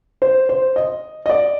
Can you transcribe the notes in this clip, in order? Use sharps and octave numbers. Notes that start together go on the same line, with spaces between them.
C5
C5
D#5
D#5
D5